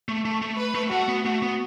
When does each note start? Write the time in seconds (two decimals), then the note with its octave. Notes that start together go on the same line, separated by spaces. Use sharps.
0.09 A3
0.25 A3
0.42 A3
0.58 B4
0.75 A3
0.92 A3 F#4
1.09 B3
1.26 A3 F#4
1.42 B3